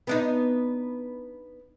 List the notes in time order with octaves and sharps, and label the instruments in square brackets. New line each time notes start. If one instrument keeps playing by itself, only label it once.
[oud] B3 D4 D#4